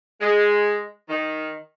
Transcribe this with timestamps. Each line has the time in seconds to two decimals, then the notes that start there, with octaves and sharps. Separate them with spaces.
0.21 G#3
1.10 D#3